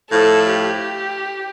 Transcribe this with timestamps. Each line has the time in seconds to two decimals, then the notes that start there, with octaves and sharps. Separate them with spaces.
0.10 A2 F3 A3 A4
0.52 G4